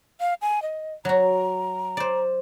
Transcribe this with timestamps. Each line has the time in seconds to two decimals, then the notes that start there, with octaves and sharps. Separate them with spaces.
0.20 F5
0.42 G#5
0.62 D#5
1.05 F#3 F#4 A#5
1.97 C5 D5